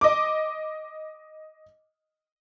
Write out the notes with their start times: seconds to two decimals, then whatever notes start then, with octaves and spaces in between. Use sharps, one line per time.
0.01 D#5 D6